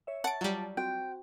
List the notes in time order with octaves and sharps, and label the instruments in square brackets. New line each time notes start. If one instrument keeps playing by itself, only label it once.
[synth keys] C#5 E5
[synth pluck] F#5 D7 [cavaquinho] A5
[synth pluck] F#3 G3 [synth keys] F4 D5
[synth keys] C4 F#4 [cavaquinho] G5